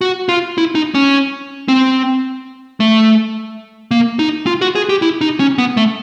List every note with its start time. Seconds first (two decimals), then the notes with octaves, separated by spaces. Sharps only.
0.01 F#4
0.29 F4
0.58 E4
0.75 D#4
0.95 C#4
1.68 C4
2.80 A3
3.91 A#3
4.19 D#4
4.47 F4
4.61 F#4
4.75 G#4
4.89 G4
5.02 E4
5.21 D#4
5.40 C#4
5.58 B3
5.77 A3